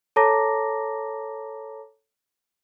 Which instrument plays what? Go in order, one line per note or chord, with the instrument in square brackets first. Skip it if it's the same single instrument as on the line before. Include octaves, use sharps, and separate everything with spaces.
[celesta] A4 C#5 A5 A#5 D6 A#6